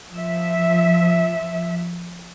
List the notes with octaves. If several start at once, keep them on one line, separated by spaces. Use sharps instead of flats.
F3 E5